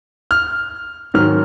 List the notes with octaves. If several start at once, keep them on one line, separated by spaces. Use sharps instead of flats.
F6
G#2 D#3 F#3 F6